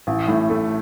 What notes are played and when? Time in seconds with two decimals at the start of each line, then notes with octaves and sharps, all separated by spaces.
0.07 A1
0.28 A2
0.50 A3